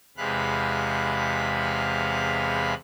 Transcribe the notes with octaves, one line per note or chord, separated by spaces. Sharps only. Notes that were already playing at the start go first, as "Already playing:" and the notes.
E2 C3 G#3 F5 B5 F#6